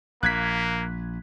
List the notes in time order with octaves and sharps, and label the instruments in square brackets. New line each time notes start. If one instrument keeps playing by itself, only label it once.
[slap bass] A#1 [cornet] A#3 [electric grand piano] F#6 G#6 B6